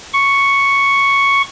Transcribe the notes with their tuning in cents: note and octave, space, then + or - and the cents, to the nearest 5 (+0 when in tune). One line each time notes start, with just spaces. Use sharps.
C#6 +0